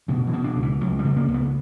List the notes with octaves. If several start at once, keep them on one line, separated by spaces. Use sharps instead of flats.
B2 D3
E3
B2
D4
C#2
E3
C#2 F#3
G3
C#2
A#3
C#2
B3